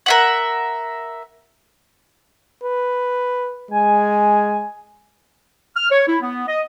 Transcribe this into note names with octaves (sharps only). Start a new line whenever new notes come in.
A#4 E5 F#5
B4
G#3 G#5
F6
C#5
E4
B3
D#5